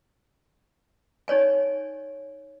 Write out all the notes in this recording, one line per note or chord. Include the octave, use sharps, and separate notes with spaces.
D#4 C#5 D5 G#5